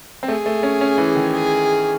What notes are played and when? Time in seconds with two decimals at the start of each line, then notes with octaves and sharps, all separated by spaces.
0.23 C4
0.28 A3 G#4
0.46 A3
0.63 C#4
0.81 C#4
0.98 E3
1.15 D#3
1.33 G#4